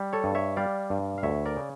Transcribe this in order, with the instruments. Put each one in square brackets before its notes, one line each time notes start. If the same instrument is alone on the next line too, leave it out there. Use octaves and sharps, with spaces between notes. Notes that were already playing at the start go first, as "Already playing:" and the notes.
Already playing: [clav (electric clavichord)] G3
A4 C#5
G2
C#5 E5
G3 D5 F5
G2
F5
D2 C#5 E5
A#4 D5
C#3